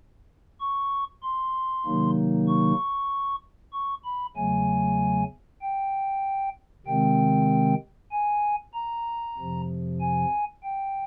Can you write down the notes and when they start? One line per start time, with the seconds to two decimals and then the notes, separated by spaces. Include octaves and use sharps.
0.60 C#6
1.22 C6
1.86 C3 D#3 F#3 A#3 D#4
2.48 C#6
3.73 C#6
4.05 B5
4.36 E2 C#3 F#3 A3 G#5
5.61 G5
6.87 C3 D#3 G#3 C4 G5
8.11 G#5
8.74 A#5
9.37 F2 C3 F3
10.00 G#5
10.63 G5